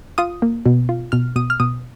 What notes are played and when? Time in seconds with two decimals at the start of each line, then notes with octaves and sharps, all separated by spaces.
0.18 F4 D#6
0.42 A#3
0.66 B2
0.89 F4
1.12 B2 F6
1.36 B2 D#6
1.50 F6
1.60 B2 D#6